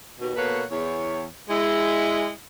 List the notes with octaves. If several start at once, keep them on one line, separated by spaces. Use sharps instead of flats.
D#2 B2
B2 A#3 A4 B4 C#5 F#5
E2 C#5
G#3 E4